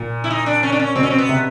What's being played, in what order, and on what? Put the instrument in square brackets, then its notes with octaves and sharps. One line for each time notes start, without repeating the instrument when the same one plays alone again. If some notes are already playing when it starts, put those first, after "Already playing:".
Already playing: [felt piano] A#2
[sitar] E4
D#4
D4
C#4
D4
C#4
[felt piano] B2 [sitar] C4
[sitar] C#4
C4
B3
[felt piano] C3